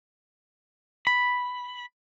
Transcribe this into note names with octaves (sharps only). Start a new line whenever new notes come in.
B5